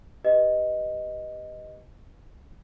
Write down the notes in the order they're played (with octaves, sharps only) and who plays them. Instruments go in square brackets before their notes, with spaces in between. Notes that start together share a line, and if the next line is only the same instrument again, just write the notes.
[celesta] G4 B4 D#5